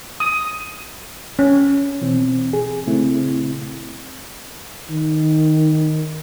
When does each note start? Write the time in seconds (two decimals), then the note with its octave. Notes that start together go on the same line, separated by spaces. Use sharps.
0.20 D#6
1.39 C#4
2.01 B2 E3 C4
2.53 G#4
2.86 A#2 C#3 A3 C4 E4
4.90 D#3